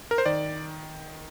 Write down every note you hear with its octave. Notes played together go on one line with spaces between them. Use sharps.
A#4
C5
D#3 D5